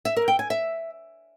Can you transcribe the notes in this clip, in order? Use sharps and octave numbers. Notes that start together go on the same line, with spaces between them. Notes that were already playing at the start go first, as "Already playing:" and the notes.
E5
A#4
G5
G#5
E5